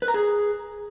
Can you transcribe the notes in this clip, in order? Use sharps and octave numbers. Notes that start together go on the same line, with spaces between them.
B4
A#5
G#4